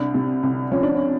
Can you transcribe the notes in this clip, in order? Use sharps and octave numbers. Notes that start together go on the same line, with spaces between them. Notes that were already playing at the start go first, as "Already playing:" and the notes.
Already playing: C2 D4
C3
C2
F3 C#4
D4
C#4